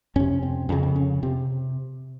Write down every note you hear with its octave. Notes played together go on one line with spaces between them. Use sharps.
F2 C3 C#4
C4
F2 C#3 C#4
C4
C#4
C3 C4